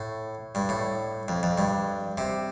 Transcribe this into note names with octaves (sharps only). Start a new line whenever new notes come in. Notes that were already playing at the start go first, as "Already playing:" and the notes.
Already playing: A2
G2
A2
F2
F2
G2
C3